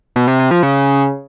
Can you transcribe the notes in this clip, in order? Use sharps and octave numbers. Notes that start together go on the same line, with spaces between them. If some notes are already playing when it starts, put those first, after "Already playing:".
B2
C3
C3
F3
C#3